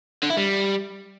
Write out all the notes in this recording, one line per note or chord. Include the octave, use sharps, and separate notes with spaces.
D3
E4
G3